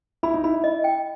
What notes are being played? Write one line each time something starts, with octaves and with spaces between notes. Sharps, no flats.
E4 B5
D#4
E4 B5
D#5
G5